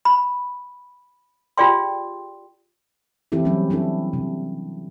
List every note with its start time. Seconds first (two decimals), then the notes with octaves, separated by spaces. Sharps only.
0.05 B5
1.57 F4 G4 G#4 D5 G5 C6
3.32 E3 C4 E4 G4 A4
3.45 F#3 G3 A#3 C4 C#4
3.70 C4 D4 E4 A4
4.13 C3